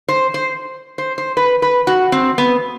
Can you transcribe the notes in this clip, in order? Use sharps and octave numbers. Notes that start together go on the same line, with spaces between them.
C5
C5
C5
C5
B4
B4
F#4
C4
B3